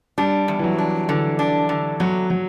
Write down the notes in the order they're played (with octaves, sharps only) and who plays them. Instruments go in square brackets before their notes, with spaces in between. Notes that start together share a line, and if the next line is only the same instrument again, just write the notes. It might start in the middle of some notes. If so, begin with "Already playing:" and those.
[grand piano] G3 [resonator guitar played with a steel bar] D4
[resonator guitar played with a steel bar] E2
[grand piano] E3
F#3
[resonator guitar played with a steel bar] D4
[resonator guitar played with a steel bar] D3 [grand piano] E3
[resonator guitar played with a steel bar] D4
D3
[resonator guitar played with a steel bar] E2 [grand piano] F#3
[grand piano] F#3